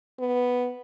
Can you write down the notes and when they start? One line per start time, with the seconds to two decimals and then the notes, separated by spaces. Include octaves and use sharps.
0.19 B3